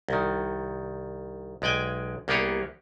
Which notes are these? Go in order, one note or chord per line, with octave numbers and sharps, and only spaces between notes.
C2 D#3
B1 G#3 D5 G5 G#5
C2 A#3 B3 G4 G#4 C#5